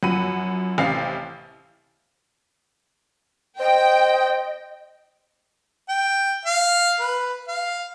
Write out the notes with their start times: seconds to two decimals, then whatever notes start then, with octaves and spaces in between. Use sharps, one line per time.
0.03 F#2 F3 F#5 B5 D#7
0.78 A1 C3 F5 C7
3.60 C5 D#5 G5
5.89 G5
6.45 F5
7.00 B4
7.48 F5